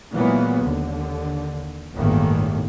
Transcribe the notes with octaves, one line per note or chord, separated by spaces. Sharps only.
A#2 E3 F#3 G#3 A#3 B3
D#2 D3
G1 E2 A2 D#3 A#3